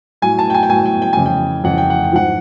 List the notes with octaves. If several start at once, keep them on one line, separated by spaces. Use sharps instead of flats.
A2 F#3 G#5
A5
G5
G#5
G5
A2 F#3 G#5
G5
G5
F2 C#3 E3 G#5
G5
F2 C#3 E3 F#5
G5
F#5
G5
G#2 F3 F#5